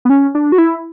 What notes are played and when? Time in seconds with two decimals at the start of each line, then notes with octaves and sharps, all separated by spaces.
0.05 B3
0.10 C#4
0.35 D4
0.52 F#4
0.58 E4